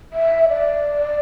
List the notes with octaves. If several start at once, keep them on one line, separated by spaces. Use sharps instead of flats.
E5
D5